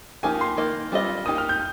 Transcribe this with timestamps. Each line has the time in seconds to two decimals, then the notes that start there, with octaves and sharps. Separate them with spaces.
0.23 F3 A#3 D#4 G4 G#5
0.41 C6
0.57 D#3 A#3 D#5
0.92 G3 C4 F4 C5 D#5
1.26 A#3 D#4 G4 D#6
1.38 F6
1.49 G6